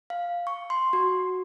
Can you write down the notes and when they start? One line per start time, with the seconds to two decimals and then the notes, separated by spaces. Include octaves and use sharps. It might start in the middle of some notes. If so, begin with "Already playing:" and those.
0.10 F5
0.47 C#6
0.70 C6
0.93 F#4